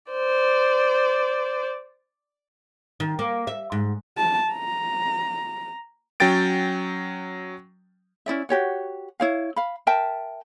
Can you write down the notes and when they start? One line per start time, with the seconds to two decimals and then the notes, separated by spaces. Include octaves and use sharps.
0.12 C5 D5
3.00 D#3
3.19 A#3
3.47 E5
3.72 G#2
4.18 A5
4.52 A#5
6.20 F#3 C#4 G5 A6 D7
8.26 C#4 E4 D5 E5
8.49 F#4 G4 C#5 F#5
9.20 E4 C#5 F5
9.56 F5 B5
9.87 A#4 E5 G5 A5